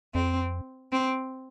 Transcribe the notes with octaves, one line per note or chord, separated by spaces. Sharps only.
F2 C4
C4